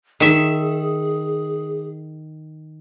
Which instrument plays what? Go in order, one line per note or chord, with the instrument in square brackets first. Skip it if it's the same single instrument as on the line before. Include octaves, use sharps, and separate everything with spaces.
[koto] D#3 E5 [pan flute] G#4